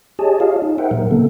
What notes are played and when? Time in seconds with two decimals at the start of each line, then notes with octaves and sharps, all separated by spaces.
0.19 G4 G#4 C#5 D#5 G#5 A5
0.40 F4 G4 G#4 C#5 D#5 F5
0.62 D#4
0.78 A#4 C5 E5 F#5 G5
0.91 A#2 F#3 A#4
1.11 C#3 A#3 B3 A4